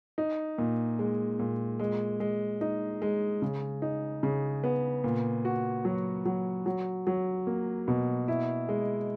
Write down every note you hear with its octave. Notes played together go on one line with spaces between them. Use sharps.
D#4
A#2
G#3
A#2
G#3
G#3
D#4
G#3
C#3
D#4
C#3
B3
A#2
F#4
F#3
F#3
F#3
F#3
A#3
B2
E4
G#3